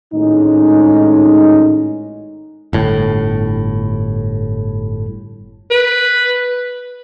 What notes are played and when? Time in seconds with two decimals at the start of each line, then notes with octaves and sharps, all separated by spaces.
0.14 G#1 A2 G#3 C#4 D#4
2.73 G1 A2
5.71 B4